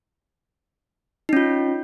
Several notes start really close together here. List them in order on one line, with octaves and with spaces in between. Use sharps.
D#4 C#4 F4